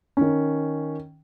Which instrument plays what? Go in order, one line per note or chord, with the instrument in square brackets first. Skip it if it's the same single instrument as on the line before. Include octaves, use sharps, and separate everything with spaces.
[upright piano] D#3 C#4